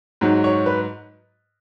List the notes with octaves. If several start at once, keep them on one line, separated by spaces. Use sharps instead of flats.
G#2 F#3
C#5
B4